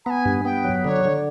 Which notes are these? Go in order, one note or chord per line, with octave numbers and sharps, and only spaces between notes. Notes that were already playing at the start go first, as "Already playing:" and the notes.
B3 G#5 A#5
G2
B3 G5
F#3
D3 C#5
D3